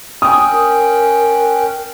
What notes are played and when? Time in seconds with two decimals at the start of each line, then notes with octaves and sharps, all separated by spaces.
0.22 C#4 G5 D#6 F#6
0.51 A#4